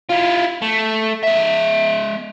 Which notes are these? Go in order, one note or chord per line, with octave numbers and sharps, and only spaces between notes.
E4 F4
A3
G#3 E5